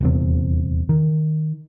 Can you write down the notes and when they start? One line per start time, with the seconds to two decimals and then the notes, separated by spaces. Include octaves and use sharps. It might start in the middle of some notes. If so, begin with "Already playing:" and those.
0.01 D#1 E2 C3
0.89 D#3